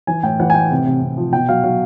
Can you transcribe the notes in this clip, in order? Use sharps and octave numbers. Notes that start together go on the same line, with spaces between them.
E3 G#5
A2 G5
E3 F#5
G#5
A2 G5
C3
C3
C3
F3
B2 G5
F#3 F5
F#3 F5